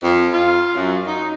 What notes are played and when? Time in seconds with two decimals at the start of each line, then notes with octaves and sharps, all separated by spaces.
0.02 F2
0.33 F4
0.74 F#2
1.06 D#4